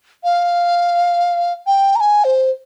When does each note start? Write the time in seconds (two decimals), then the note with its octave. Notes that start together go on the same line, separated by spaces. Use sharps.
0.24 F5
1.67 G5
1.96 A#5
2.00 G#5
2.24 C5